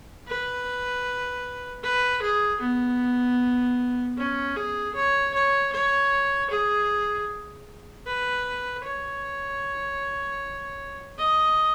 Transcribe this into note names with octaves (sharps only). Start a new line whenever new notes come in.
B4
B4
G#4
B3
C#4
G#4
C#5
C#5
C#5
G#4
B4
C#5
D#5